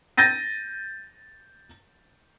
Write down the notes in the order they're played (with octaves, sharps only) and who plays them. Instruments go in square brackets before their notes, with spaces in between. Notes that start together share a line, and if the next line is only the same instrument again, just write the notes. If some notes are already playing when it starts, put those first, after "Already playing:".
[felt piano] G6 A6 A#6 D#7